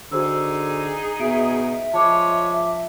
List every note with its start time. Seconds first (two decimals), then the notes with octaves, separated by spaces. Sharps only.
0.11 D3 D#4 F#4 G#4 C5 E6
1.20 B2 E5 D7
1.94 F3 G#3 C#5 A5 D6